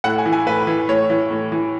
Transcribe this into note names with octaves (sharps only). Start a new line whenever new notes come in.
A2 F#5
G#5
E3
G#5
A2 B4
E3
A2 C#5
E3
A2
E3